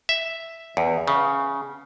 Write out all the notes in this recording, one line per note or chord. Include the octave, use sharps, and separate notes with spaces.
E5
E2
C#3